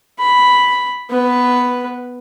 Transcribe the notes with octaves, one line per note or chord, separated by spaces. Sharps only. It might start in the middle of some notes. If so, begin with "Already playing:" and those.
B5
B3 B4